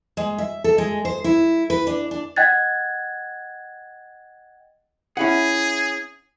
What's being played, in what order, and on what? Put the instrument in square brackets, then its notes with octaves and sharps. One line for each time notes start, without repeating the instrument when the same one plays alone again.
[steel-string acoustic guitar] G#3
E5
A4
G#3
C5
E4
B4
D4
D4
[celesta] D#5 F#5 G5 F#6 G#6 A6
[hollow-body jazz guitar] C#4 E4 F#5 [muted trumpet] G#4